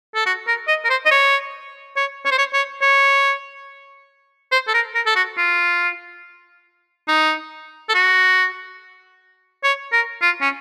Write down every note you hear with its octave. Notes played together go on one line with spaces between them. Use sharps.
A4
F#4
A#4
D#5
A#4
C5
D#5
C#5
C#5
C#5
C5
C#5
C#5
C#5
C5
A4
A#4
A#4
A4
F#4
F4
D#4
A4
F#4
C#5
A#4
F4
C#4